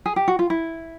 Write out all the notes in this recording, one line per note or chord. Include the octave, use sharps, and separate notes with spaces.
G#4
G4
F#4
F4
E4